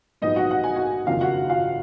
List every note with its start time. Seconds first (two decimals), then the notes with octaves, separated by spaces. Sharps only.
0.22 A#1 G#2 F#3 B3 D#4 D#5
0.36 F#4 F#5
0.51 F#5
0.64 G#5
0.76 F#4 F#5
1.07 F#1 F2 D#3 A#3 D4 F4 F5
1.21 F#4 F#5
1.49 F4 F5